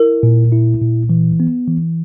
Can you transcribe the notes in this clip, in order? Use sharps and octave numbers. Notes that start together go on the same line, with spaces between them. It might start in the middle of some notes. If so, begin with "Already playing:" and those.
Already playing: E4 A#4
A#2
E4
A#2
E3
B3
E3